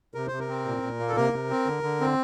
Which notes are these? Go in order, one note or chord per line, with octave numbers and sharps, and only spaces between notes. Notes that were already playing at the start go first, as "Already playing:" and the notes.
C3 A#4
C3 C5
A#4
C4
A#2
A#2
A#3
A4
C3 A#4
C3
C4
D3
D3
C4